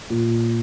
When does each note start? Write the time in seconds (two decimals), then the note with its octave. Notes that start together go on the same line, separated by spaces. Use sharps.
0.10 A#2